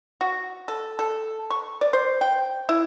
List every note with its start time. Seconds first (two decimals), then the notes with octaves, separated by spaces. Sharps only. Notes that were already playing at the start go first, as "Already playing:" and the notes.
0.21 F#4
0.68 A4
0.99 A4
1.50 C#6
1.81 D5
1.93 C5
2.21 G5
2.69 E4